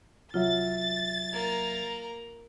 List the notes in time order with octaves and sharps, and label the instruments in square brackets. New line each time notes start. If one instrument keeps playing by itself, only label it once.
[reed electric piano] C2 F#3 E5 [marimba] F4 [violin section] A6
[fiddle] A#3 A#5